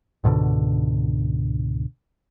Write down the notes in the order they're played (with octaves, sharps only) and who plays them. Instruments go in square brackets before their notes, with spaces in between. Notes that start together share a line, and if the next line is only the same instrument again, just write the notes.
[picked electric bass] C#2 G#2 B2 D3